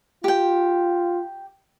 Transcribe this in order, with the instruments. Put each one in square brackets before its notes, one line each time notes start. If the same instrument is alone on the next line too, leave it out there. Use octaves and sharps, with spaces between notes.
[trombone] F4 [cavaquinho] G4 G5